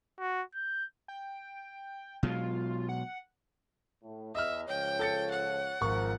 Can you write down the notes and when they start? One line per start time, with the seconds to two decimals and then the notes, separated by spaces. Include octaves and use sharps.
0.20 F#4
0.55 G6
1.08 G5
2.23 B2 F#3 G#3 F4
2.89 F#5
4.03 A2
4.35 E2 D#5 E5 F6
4.68 C#2 F3 C#5 G5
4.99 A4 A6 C#7
5.31 F#5
5.81 G#1 F3 A#4 C#6